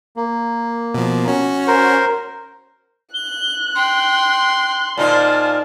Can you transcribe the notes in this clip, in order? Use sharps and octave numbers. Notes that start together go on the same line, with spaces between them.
A#3
B2 F3
C#4 F#4
A#4 C5
F#6 G7
G5 C6
A#2 D#4 F4 C5 D5 A5